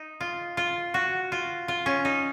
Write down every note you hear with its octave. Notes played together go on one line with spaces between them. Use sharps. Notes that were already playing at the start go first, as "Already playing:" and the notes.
Already playing: D#4
F4
F4
F#4
F4
F4
C#4
D#4